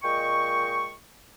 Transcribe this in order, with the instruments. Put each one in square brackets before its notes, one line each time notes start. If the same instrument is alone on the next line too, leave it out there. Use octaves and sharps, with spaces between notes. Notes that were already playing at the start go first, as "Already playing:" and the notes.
[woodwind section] A#2 G#3 D#5 G5 C#6